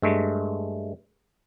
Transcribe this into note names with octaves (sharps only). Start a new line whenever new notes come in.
G2 G#3 A3